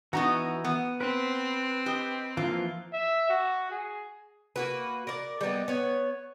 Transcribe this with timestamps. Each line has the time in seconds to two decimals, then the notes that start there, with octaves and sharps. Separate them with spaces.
0.13 E3 B3 D#4 F#4 A#5 C#6
0.64 B3
1.01 C4 B4
1.86 G4 D#5
2.37 E3 F3 A#3 F4
2.93 E5
3.29 F#4
3.71 G#4
4.56 A#3 F#4 B4
5.07 A#4 D5
5.41 G3 A#3 B3 D#4
5.68 B3 C#5